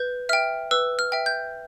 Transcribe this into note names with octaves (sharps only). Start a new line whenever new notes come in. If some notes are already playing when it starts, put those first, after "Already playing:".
Already playing: B4 G6
E5 G5 F6
B4 E6
F6
E5 G5
G6